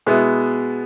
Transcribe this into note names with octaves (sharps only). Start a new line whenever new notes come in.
B2 G#3 B3 E4